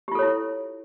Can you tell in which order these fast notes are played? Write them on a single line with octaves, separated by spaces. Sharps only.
G4 F4 A4 C#5 E4